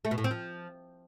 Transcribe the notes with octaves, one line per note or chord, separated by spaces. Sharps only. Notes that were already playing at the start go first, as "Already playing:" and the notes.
A3
B2
A2
C4
F3